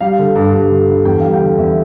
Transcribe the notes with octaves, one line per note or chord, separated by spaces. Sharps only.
G3 F5
D3
G2
G2
D3
D3
E2 G5
G3 F5
G5
D3
E2 E5